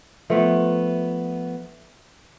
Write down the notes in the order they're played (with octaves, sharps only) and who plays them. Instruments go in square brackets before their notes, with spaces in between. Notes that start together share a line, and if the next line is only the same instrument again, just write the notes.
[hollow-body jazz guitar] F3 A3 B3 [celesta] A4 B4 E5